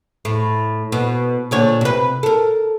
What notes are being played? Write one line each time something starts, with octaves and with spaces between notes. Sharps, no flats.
A2
B2
A#2 D3 C#5
C3 B4
A4 A#4